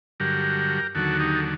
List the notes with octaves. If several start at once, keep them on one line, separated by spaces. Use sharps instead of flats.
G2 D3 F#3 G4 A#4
D#2 D3 F#3 F#4 A4
D#4 G4
A4